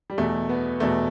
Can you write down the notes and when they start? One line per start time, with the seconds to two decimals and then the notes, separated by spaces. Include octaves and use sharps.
0.10 G3
0.18 E2 B2 A3
0.49 B3
0.80 E2 B2 A3